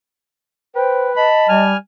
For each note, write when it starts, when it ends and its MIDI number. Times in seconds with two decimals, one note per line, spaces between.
0.76 1.27 71
0.76 1.10 72
0.76 1.13 79
1.16 1.64 75
1.16 1.70 81
1.16 1.47 83
1.49 1.75 55
1.49 1.77 80
1.49 1.77 89